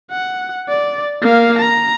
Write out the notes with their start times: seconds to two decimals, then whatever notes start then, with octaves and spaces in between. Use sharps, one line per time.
0.11 F#5
0.68 D5
1.22 A#3 F5
1.58 A#5